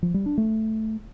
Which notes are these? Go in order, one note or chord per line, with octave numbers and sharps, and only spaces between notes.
F3
G3
D4
A3